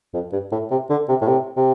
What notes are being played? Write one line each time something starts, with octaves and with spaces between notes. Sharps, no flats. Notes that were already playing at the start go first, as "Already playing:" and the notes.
F2
G2
A2
C3
D3
C3
A2
C3
C3